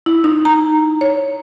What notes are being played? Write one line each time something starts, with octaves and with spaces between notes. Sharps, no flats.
E4
D#4
A#5
C#5